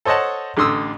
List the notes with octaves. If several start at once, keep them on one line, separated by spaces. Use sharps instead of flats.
A4 C5 C#5 D#5 F#5 A5
A1 D3 C6 D#6 E6